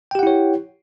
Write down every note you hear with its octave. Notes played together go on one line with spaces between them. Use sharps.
E4 G4 C#5 F#5 G5